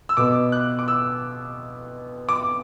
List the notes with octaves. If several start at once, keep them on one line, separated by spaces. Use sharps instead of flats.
E6
B2 B3 D6
F#6
D6
E6
D6